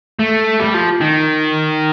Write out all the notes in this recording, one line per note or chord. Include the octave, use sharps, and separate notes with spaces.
A3
G3
F3
D#3